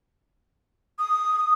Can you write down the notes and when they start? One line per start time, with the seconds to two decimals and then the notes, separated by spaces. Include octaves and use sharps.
0.99 D#6